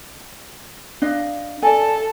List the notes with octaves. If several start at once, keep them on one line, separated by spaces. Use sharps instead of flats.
D4 D#5 F5
A4 D5 G#5